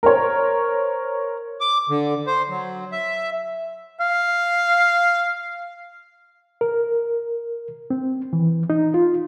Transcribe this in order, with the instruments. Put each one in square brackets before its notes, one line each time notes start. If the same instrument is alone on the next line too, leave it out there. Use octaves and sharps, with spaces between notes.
[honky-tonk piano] A#4 C5 C#5
[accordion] D6
D3
C5
F#3
E5
[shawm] F5
[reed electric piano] A#4
C4
E3
D#4
F4